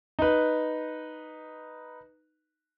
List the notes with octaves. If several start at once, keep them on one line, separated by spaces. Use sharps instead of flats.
D#4 B4